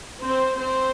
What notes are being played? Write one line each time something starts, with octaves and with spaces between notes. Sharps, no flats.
C4 C5
C4 C5